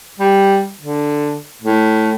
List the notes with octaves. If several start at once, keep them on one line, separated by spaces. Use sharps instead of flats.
G3
D3
A2